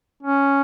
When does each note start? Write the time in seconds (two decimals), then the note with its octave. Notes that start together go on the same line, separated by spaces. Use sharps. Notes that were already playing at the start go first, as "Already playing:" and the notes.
0.23 C#4